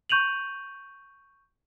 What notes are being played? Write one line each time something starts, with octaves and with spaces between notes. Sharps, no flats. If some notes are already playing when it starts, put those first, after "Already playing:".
C#6 G6 D#7 F7 F#7